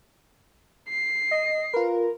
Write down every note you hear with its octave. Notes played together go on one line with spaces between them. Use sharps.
C7
D#5
F4 A#4 B4